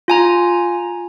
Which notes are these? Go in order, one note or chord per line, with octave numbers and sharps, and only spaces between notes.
F4 G#5 A#5